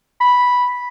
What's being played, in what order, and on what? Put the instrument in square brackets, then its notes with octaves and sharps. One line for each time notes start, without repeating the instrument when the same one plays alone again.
[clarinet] B5